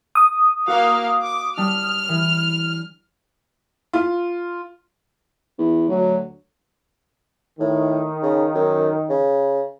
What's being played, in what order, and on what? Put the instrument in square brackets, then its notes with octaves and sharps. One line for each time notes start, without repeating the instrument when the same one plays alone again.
[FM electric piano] D#6
[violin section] A#3 F5 [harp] F#4
[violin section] D6
[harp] G3 D4 [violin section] F6
[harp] E3
[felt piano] F4
[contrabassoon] E2
[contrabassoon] D2 [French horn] F#3
[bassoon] A2 [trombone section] D#3
[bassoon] C#3
F#2
C#3